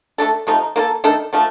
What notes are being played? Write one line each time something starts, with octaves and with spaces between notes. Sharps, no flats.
A3 D4 A4
C3 F3 A3 D#4
A#3 F4 A4
D#3 A3 D4 A4
D3 F3 A3